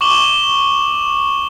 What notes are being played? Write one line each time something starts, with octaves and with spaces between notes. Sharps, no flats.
C#6 D6 E7 F#7 G7